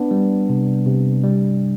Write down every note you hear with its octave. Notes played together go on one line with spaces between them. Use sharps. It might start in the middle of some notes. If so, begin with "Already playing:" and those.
Already playing: B3 D4
G3
C3
C3
G3